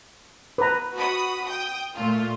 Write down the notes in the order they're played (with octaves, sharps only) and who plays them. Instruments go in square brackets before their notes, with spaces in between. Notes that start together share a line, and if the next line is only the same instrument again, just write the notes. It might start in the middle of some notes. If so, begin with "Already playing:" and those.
[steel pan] B4 A#5
[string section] F#4 B5 D#6
G5 D#6
A#2 A3 F4